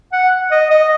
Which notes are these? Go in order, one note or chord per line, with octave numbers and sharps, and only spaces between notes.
F#5
D#5
D#5